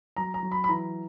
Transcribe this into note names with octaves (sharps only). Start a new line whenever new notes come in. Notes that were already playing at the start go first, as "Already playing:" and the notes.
F#3 A#5
A#5
F#3
B5
B5
E3 A#5